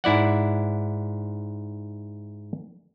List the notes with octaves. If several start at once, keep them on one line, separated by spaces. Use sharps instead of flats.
G#2 E4 D5 F#5